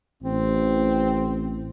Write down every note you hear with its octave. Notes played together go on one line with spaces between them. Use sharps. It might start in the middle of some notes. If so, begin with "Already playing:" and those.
A1 C4